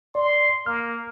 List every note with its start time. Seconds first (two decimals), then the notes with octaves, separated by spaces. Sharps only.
0.15 D5 C6
0.66 A#3 F6